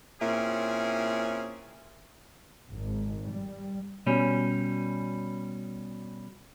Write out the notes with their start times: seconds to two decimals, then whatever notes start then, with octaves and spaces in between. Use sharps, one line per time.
0.21 A#2 C4 C#4 E4 G#4
2.71 G#1
3.31 G3
4.07 B2 G3 C#4